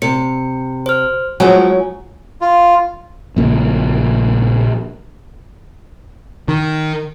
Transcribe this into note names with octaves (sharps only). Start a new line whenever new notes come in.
C3 C#7
C5 F6
F3 F#3 G#3 C#4 C#5 G#5
F4
A#1 A#2 C#3
D#3